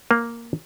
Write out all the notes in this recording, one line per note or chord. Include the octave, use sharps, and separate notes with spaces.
A#3